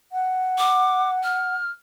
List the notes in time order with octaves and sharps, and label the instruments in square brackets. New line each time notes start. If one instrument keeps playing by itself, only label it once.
[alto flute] F#5
[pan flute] D6
F6